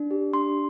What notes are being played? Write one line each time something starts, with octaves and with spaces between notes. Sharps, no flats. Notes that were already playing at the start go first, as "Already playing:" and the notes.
Already playing: D4
G4
D4 C6